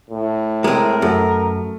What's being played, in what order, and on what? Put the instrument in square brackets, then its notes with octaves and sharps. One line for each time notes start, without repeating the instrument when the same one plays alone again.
[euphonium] A2
[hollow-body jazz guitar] G#3 C4 [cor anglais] A#4
[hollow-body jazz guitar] F#2 [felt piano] A3